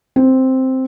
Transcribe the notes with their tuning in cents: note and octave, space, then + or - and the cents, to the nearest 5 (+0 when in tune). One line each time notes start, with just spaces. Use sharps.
C4 +0